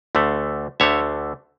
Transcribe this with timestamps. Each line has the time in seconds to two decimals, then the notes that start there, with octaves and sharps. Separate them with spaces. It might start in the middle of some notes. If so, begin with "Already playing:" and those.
0.15 D2 D3 A3
0.80 D2 D3 A3 C#5 E5